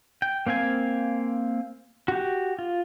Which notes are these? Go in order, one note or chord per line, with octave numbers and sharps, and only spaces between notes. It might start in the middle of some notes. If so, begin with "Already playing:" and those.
G5
A#3 C4 F5 G#5
F#4 G4
F4